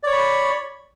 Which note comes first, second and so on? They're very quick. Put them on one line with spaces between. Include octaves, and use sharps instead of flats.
D5 C#5 C#6 B5